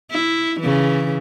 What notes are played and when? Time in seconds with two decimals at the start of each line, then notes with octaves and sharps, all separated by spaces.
0.11 E4
0.60 C#3 E3